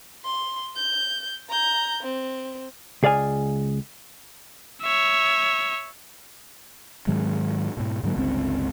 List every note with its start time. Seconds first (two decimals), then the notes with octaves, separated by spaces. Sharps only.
0.24 C6
0.76 G6
1.49 A#5 G6
2.03 C4
3.03 C#2 G#4 D5 F5 G#5
4.82 C#5 E5
7.07 G#2 D#3 F#3 G#3
7.77 G#2 B2
8.03 G#2 D3 F#3 A#3
8.16 G1 C#2 G2 C4